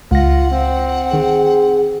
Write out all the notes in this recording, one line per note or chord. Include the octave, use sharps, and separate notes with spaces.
C#2 F4 F#5 A#6
C4
D#3 G#4